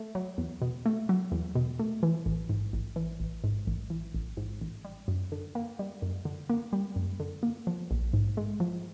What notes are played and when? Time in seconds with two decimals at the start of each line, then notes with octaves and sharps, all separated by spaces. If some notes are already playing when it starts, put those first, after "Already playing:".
Already playing: A3
0.15 F#3
0.38 E2
0.62 B2
0.86 A3
1.09 F#3
1.32 E2
1.55 B2
1.79 A3
2.03 E3
2.26 A1
2.49 G#2
2.73 A1
2.96 E3
3.20 A1
3.44 G#2
3.67 A1
3.90 E3
4.14 A1
4.37 G#2
4.61 A1
4.85 G3
5.08 F#2
5.32 D3
5.55 A#3
5.79 G3
6.02 F#2
6.25 D3
6.50 A#3
6.73 G3
6.96 F#2
7.20 D3
7.43 A#3
7.67 F3
7.91 A#1
8.13 G#2
8.37 G#3
8.60 F3